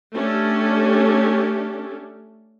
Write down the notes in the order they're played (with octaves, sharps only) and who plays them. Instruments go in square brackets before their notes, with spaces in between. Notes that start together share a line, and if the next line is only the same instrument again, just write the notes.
[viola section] A3 C#4 D4 G4 A4